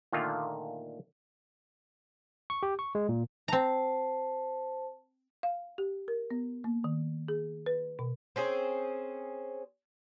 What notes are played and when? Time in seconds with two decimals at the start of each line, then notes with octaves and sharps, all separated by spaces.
0.13 A#2 D3 D#3 A3 A#3 F4
2.50 C#6
2.63 G4
2.79 C#6
2.95 G#3
3.09 A#2
3.48 C4 C5 A5 A#5
5.43 F5
5.78 G4
6.08 A#4
6.31 B3
6.64 A#3
6.84 D#3
7.28 G#4
7.66 B4
7.99 B2
8.36 C4 C#4 G#4 C5